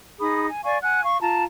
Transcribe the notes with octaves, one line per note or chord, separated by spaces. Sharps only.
D#4 G#4 B5 D#6
G#5
D5 F5 G#5 C#6
F#5 G#5 F#6
F5 C#6
F4 A5 A#5